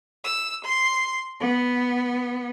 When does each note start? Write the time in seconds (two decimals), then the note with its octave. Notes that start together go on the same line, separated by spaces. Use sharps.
0.23 E6
0.64 C6
1.40 B3